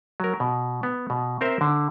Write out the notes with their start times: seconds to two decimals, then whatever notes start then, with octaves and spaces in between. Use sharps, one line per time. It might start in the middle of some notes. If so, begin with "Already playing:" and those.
0.20 F#3 A#4
0.40 B2
0.83 B3
1.10 B2
1.41 C4 A#4 C5 E5
1.61 D3